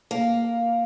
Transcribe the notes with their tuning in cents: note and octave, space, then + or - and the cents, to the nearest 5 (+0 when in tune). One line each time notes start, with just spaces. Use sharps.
A#3 +0 F5 +0